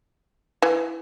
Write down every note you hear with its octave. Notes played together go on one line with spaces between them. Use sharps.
E3